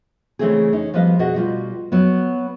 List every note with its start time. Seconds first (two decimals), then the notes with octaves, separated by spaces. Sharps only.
0.39 C#3 E3 G#3 A3 C4 G#4
0.73 C#4 D#4
0.94 F3 G3 B3 B4 D#5 F5
1.19 B2 F#4 G#4 D#5 F#5
1.35 B2 G3 F4
1.92 F#3 B3